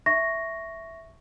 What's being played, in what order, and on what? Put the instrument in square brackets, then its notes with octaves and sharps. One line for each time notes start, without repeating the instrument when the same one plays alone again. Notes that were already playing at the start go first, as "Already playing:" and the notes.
[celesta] E5 C#6 A#6